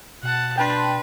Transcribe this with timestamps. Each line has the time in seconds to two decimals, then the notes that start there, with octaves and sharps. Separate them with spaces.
0.23 B2 F#5 A5
0.58 D4 B4 G5 A5 C6